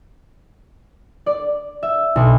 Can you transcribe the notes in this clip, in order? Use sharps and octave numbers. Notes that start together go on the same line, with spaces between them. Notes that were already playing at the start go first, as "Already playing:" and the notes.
D5
E5
B1